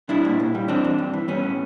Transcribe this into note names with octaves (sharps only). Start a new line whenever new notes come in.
G3 D4 E4
A#2
A#2
G3
E3 C4 D4
G2
G2
E3
G3 B3 C#4
A2